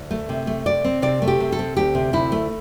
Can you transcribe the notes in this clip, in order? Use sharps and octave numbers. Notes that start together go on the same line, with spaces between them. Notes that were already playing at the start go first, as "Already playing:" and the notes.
Already playing: D2
A3
C3
A3
C3 D5
C4
C3 D5
A3
G4
C3
A4
C4
D2 G4
C3
D2 E4
A3